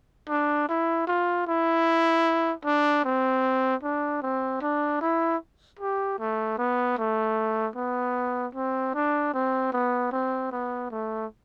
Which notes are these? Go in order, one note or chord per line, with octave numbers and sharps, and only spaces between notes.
D4
E4
F4
E4
D4
C4
D4
C4
D4
E4
G4
A3
B3
A3
B3
C4
D4
C4
B3
C4
B3
A3